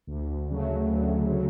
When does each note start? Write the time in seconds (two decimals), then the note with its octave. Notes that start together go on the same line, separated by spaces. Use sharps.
0.07 D2
0.50 C#3 F#3 A3
0.92 D2
1.34 C#3 F#3